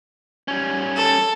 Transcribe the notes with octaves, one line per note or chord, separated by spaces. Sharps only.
G3 C#4
A4